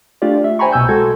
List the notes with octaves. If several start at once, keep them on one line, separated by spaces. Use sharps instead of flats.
A3 D4 F4 G4 D5
E5
C5 G5 G#5 A#5 B5 C#6
C2 B2 G#5 E6 G6
G#3 F#4 A4 G#6